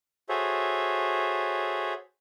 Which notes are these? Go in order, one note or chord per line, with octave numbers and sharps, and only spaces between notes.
F#4 G#4 A4 C5 C#5 E5